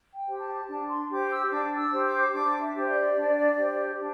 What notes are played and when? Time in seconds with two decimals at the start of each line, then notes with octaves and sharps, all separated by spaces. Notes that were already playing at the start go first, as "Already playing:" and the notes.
0.13 G5
0.27 G4 C5
0.40 A5
0.68 D4 A5
0.88 C6
1.09 G4 C5 D6
1.30 E6
1.50 D4 D6
1.78 E6
1.91 G4 C5
2.05 D6
2.33 D4 D6
2.60 E5
2.74 G4 C5
2.88 D5
3.16 D4
3.57 G4 C5
3.99 D4